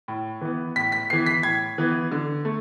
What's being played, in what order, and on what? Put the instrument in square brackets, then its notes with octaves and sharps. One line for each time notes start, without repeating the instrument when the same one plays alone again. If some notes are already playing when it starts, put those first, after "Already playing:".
[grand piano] A2
E3 B3
A2 B6
B6
E3 B3 C7
B6
A2 G#6
E3 B3
D3
A3